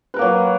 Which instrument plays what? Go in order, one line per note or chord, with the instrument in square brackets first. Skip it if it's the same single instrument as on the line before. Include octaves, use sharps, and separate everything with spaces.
[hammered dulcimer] B4
A#4
A#3
F#3